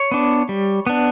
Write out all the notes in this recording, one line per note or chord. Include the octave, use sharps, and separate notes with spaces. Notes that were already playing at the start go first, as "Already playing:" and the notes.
Already playing: C#5
B3 D4
G3
B3 D4